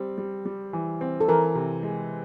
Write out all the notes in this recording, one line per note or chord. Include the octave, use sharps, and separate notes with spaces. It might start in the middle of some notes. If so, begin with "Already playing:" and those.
Already playing: G3 C4
G3
G3
E3
C4
A4
E3 A#4
C3
G#3